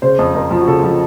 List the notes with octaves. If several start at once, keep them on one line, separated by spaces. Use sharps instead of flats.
C#3 C5
F2
F2 A#4
F3
F#4
C#3 A4
F3